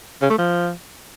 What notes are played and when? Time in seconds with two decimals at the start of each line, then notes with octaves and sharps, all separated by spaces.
0.22 C#3
0.30 A3
0.38 F3